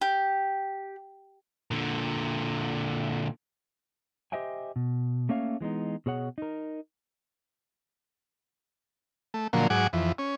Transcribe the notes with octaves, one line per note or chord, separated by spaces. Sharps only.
G4
A#2 D3
G4 C5 D#5 E5 G5 G#5
B2
A3 A#3 C#4 C#5 E5 F5
E3 G#3 B3 D#4
B2 G#4 C#5 F#5
D#4 A#4
A3
A#2 D3 F3 F#3 A#3
G#2 F#3 F#5 G#5 D6
F2 E3
C#4